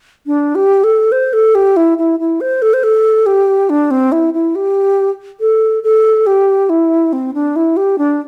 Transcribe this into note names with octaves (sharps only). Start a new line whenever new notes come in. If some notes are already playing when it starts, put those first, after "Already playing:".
D4
G4
A4
C5
A4
G4
E4
E4
E4
C5
A4
C5
A4
G4
D4
C4
E4
E4
G4
A4
A4
G4
E4
C4
D4
E4
G4
D4